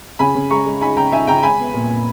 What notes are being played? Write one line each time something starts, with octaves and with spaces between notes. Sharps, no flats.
C#3 G#5 B5
C#3
G#3 A#5 C#6
G#3
D#4 G#5 B5
C#3 G5 A#5
D#4 E5 G#5
C#3 G5 A#5
G#3 G#5 B5
B3
A#2
A#2